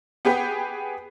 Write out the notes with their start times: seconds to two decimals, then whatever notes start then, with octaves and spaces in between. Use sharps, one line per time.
0.25 B3 G4 G#4 B4 G5